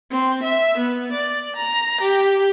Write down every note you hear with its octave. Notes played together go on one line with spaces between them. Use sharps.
C4
E5
B3
D5
A#5
G4